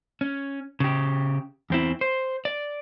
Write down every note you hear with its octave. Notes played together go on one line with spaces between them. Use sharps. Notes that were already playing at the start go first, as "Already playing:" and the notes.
C#4
C#3 G4
E2 C4 E4
C5
D5